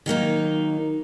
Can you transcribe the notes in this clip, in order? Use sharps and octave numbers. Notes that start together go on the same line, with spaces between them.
D#3 F#3 A#3 D#4